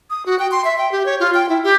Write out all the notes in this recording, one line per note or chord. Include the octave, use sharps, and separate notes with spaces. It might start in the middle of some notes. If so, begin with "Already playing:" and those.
D#6
F#4
G5
C6
E5
G5
G4
C#5
F4
G5
E4
G4